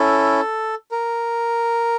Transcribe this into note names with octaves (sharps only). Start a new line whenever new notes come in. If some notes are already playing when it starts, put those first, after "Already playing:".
Already playing: C#4 E4 A4
A#4